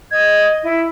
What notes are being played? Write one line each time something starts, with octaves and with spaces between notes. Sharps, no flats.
D#5 G#6
E4